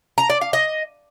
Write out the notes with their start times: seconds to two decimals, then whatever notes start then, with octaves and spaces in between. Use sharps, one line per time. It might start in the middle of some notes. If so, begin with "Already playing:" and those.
0.18 A#5
0.30 D5
0.41 F5
0.53 D#5